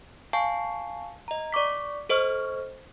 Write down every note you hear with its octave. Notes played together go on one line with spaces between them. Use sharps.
F5 G#5 A5 C#6 G6 C7
D#5 A#5
D5 C#6 D6 B6
A4 C5 D#5 C#6 F6